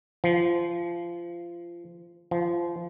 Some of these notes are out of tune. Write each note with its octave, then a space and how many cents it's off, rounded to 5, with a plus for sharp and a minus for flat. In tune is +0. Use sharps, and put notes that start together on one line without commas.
F3 -20
F3 -20